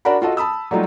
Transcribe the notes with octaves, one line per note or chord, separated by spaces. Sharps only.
D4 F#4 A#4 D5 F#5 B5
F4 F#4 A4 D#5
A5 B5 D#6 E6
F#3 G3 A3 D#4 F4